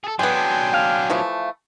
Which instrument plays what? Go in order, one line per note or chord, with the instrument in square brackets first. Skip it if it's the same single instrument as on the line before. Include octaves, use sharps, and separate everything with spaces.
[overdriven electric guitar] G#4 A4
[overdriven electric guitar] F#3 D4 [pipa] G#3 B3 [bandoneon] G5 G#5 C6
[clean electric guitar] F5
[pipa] E3 F3 A3